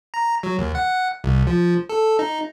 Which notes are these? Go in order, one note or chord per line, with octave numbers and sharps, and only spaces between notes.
A#5
F#3
D#2
F#5
C2
F3
A4
D#4